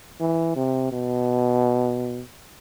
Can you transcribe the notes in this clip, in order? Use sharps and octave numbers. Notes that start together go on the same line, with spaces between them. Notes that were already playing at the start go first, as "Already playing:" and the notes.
E3
C3
B2